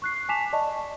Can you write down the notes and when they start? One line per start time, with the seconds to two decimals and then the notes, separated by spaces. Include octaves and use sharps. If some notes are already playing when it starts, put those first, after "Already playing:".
0.02 C#6 F#6 C7
0.29 G#5 A5 D6 B6 E7 F7
0.53 D5 D#5 A5 C#6